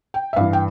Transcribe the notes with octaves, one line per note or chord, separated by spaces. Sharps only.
G5
E5
G2 E3 F5
G5